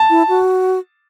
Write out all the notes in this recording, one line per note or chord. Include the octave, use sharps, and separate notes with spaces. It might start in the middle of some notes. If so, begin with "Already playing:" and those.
Already playing: A5
E4
F#4